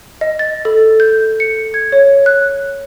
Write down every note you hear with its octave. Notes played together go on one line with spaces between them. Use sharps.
D#5
A6
A4
G6
C#7
G#6
C#5
F#6